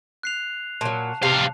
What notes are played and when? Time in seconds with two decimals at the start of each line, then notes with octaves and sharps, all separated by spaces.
0.23 F#6 C7 F7
0.81 A#2 F#3 A5
1.23 C3 G3 F5